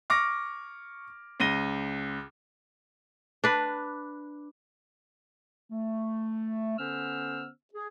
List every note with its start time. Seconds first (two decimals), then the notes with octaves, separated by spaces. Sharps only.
0.10 C#6 D6 F6 A#6
1.40 C#2 A#6 D#7 G7
3.44 D4 B4
5.70 A3
6.78 D3 B3 C#4 C5 E6 F6
7.73 G#4